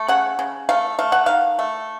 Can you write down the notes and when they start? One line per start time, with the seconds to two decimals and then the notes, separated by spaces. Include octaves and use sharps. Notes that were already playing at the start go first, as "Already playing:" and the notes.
Already playing: A3
0.08 C#3 F#5
0.39 C#3
0.69 A3 F5
0.99 A3 F5
1.12 F#5
1.26 D#3 F5
1.59 A3